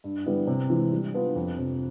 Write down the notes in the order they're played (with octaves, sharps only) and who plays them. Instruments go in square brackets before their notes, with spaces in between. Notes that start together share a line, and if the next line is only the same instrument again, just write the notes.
[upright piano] G2
D3 G3 B3 E4
C3
E3 G#3
G3
B3 D4 F4
F2
C3 F3